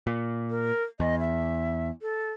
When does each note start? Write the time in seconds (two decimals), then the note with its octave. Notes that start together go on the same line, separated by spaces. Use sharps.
0.07 A#2
0.50 A#4
1.00 E2 D#5
1.20 E5
2.02 A4